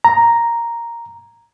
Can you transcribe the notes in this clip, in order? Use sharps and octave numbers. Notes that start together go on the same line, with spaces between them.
A#5